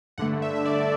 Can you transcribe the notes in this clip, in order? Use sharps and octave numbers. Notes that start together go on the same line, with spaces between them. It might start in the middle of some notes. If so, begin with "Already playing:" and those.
G2 D3 A3 F#5
E5
E5
D5